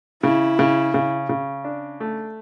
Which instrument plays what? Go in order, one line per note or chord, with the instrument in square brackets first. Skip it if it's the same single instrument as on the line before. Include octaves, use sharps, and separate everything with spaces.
[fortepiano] C#3 [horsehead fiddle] E4
[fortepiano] C#3
C#3
C#3
D4
A3